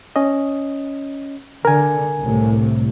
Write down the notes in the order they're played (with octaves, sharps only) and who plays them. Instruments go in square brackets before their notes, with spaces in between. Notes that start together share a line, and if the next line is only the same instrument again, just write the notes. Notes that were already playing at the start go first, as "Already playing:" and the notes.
[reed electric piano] C#4 D#5
[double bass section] D3 [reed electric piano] A#4 G#5
[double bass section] C2 A2 C3